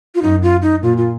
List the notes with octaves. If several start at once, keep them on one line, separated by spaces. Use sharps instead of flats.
F4
F#2 D#4
F4
D#4
A#2 F4
F4